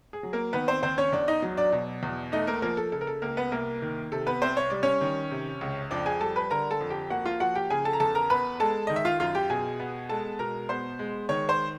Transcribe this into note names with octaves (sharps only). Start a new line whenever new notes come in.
G#4
F#3
A#3 A#4
D#3 B3 B4
C4 C5
D#2 C4 C5
C#4 C#5
E2 D4 D5
D#4 D#5
F#3
D4 D5
B2
E2
A3 D#4 D#5
A#3 A#4
F3 A#3 A#4
A4
C#3 A4
A#4
A4
C#2 A#3 A#4
B3 B4
C2 A#3 A#4
D#3
C3 A4
B3 B4
C2 C4 C5
C#5
G3 D5
C#4 C#5
D#3
C3
C#2
F2 D4 D5
G#4 G#5
G3 A4 A5
B4 B5
D3 A#4 A#5
A4 A5
F2
G4 G5
A#3 F#4 F#5
F4 F5
F3 F#4 F#5
G4 G5
C#3 G#4 G#5
A4 A5
A#5
E2 A4 A5
A#4 A#5
B3 B4 B5
G#3 A4 A5
D#3 D#5
E5
F4 F5
F#2 F4 F5
G4 G5
B2 G#4 G#5
B3
G#3 A4 A5
B2 A#4 A#5
B3 C5 C6
G#3
D#3 C#5 C#6
C5 C6